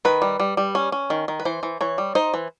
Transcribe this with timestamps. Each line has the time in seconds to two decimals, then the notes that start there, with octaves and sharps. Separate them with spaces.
0.05 D#3 B4
0.22 G3
0.40 G3
0.57 G3
0.75 C#4
0.92 C#4
1.10 D#3
1.28 D#3
1.40 B4
1.45 E3 C5
1.63 E3
1.81 E3 C#5
1.98 G3
2.15 D#4 C5
2.34 E3